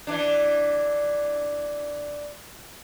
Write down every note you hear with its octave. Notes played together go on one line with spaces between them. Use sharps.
E3 D4